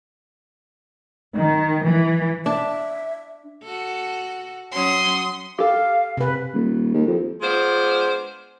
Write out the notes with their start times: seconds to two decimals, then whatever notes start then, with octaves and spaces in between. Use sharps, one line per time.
1.35 D#3
1.85 E3
2.46 D4 E5
3.63 F#4 A4
4.74 F#3 C#4 C6 D#6
5.58 G4 A4 F5
6.17 C3 B4
6.54 D#1
6.94 D#2
7.07 F2
7.42 G#3 B3 D4 F4 C5